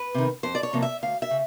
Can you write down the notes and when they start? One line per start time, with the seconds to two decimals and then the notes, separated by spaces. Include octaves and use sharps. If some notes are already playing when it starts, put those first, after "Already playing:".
Already playing: B4
0.14 C3 D#3
0.43 F2 C5
0.55 D5
0.63 C#5
0.73 C3 F3 A#3
0.82 E5
1.03 D2 F5
1.22 E5
1.31 C#3